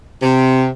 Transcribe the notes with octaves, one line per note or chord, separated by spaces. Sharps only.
C3